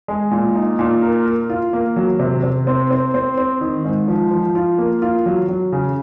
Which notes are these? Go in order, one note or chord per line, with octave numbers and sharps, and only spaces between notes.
G#3
A#2
D#4
A#2
A#4
A#4
F4
A#3
F#3
C3
C3
C4
C4
C4
C4
D#3
G#2
F3
F3
F4
A#3
F4
F#3
F#3
C#3